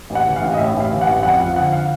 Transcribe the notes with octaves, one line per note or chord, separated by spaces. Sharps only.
A1
F#5
E3
F5
A1
D#5
A2 E5
A1
F5
E3
F#5
A1
F2 F#5
F3 F5
D3 F#5
F5